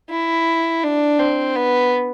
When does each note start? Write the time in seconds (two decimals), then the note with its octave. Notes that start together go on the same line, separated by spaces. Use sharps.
0.10 E4
0.84 D4
1.19 C4
1.56 B3